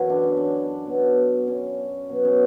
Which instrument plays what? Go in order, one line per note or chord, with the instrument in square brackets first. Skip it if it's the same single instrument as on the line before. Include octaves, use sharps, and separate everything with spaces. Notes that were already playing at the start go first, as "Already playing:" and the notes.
Already playing: [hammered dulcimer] F#2 E3 E4 F#4 A4
D4
C#4
D4
B2 F#3
C#4
B2 F#3
C#4